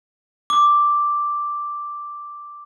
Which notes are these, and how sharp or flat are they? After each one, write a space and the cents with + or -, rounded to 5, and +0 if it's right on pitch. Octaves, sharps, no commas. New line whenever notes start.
D6 +0